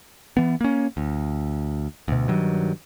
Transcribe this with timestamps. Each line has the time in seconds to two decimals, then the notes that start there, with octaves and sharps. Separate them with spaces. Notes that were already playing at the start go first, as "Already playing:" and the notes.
0.37 E3 B3
0.61 A#3 C#4
0.97 D2
2.08 D2 B2
2.28 G2 D#3 F#3